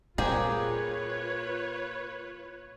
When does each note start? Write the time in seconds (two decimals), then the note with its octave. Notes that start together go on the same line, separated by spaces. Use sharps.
0.18 A#2 A#3 C4 F4 G4 G#4 B4 C#5